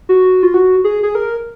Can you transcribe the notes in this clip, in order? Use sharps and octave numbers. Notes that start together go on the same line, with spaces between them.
F#4
F4
F#4
G#4
G#4
A#4